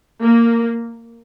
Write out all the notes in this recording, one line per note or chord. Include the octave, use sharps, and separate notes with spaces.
A#3